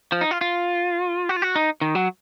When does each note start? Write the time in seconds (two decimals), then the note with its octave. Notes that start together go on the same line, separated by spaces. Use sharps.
0.12 F3
0.21 D#4
0.31 F4
0.41 F4
1.29 F#4
1.36 F4
1.42 F#4
1.56 D#4
1.81 D#3
1.95 F#3